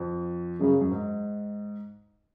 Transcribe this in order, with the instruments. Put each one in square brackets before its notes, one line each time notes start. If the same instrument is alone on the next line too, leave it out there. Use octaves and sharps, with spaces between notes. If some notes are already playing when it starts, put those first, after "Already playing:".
Already playing: [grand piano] F2
[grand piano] F#2 [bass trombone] C#3
[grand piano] F#2
G#2